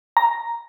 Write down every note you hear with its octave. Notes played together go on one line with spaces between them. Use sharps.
A#5